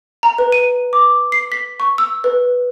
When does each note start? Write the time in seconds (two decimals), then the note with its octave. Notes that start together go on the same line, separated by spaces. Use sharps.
0.23 A#5
0.38 B4
0.52 D#7
0.93 D6
1.32 C7
1.52 B6
1.80 C#6
1.98 E6
2.24 B4